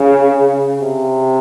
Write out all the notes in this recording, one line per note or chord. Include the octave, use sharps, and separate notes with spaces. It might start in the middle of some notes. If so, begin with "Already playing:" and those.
Already playing: C#3
C3